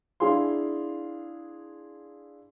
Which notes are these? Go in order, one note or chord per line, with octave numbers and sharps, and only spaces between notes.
D4 E4 G#4 F5 C6